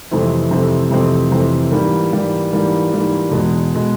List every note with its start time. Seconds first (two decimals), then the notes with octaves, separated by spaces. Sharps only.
0.11 F2 C3 E3 A3 C4
0.51 F2 C3 E3 A3 C4
0.91 F2 C3 E3 A3 C4
1.31 F2 C3 E3 A3 C4
1.71 G#2 E3 G3 A#3
2.11 G#2 E3 G3 A#3
2.52 G#2 E3 G3 A#3
2.92 G#2 E3 G3 A#3
3.31 E2 B2 G#3
3.75 B2 G#3